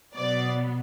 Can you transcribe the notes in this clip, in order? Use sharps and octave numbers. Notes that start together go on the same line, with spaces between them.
B2 F#3 B3 D5